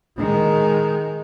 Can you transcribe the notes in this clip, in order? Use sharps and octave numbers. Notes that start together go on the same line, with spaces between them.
D#3 G#3